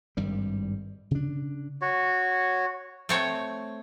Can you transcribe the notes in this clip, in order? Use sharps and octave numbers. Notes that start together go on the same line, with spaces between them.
G#1 G2 G3
C#3 D4
F#4 C#5
A3 C4 C#5